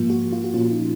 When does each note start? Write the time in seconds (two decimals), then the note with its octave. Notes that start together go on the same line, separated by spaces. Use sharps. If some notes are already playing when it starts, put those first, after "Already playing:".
Already playing: G#2 F3 A#3 F4
0.10 F#4
0.33 F4
0.44 F#4
0.54 A#2 F3 A#3 C#4 F4
0.71 D#4